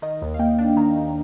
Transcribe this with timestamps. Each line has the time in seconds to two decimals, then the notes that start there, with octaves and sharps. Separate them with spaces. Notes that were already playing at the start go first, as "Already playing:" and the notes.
0.02 D#3 D#5
0.22 D#2
0.34 F5
0.39 A#3 G5
0.58 D4
0.76 D#3 A#5
0.96 D#2